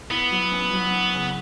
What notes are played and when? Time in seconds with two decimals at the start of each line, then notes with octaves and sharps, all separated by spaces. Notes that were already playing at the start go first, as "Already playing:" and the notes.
0.11 B3 E4
0.31 F#3
0.51 C#4
0.72 F#3
0.93 C#4
1.13 C#3